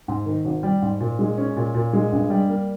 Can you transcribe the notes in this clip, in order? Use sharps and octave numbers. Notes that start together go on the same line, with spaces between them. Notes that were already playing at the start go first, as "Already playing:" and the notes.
G#2
D#3
G#1
G3
G#2
A#2
G#3
C#4
A#2
A#2
G#3
G2
G3
A#3